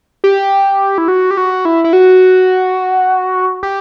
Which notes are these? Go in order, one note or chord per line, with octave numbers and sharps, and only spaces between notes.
G4
E4
F#4
G4
F#4
E4
E4
F#4
G4